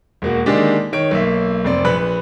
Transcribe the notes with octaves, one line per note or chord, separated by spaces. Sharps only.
E1 A#3 F#4
D3 D#3 G#3 A#3 D4 G4
D#3 C#5 D7
B1 A#3 E5
F1 C4 D5
A#1 B4 B5 F#6